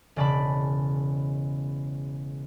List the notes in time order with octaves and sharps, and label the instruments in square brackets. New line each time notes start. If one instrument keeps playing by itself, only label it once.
[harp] E1 C#3 D5 A5 B5